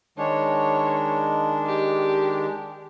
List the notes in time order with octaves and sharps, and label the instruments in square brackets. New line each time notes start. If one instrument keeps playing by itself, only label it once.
[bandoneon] D#3 G#3 D4 [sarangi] C#5
[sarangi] G4